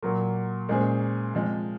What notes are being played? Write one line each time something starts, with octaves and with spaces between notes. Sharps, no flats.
A#2 F#3 A#3
A#2 G#3 C#4 G#4 C5
C3 F3 G#3